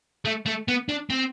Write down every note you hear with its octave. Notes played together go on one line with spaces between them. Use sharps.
A3
A3
B3
D4
C4